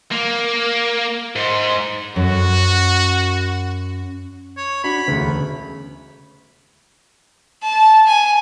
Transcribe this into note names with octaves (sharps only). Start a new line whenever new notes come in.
A#3
G#2
F#2 F#4
C#5
D4 F#4 B5
E1 D2 C#3
A5
G#5